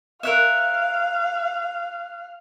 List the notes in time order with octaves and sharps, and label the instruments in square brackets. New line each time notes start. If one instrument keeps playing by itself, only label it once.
[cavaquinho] A#4 C#5 E5 [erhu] F5 [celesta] F#6 E7